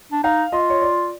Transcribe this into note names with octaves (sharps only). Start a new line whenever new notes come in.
D4
D#4 F5
F4 D#5
C#5
D5